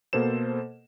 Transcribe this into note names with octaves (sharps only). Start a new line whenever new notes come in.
B2 A#3 A4 C5 E7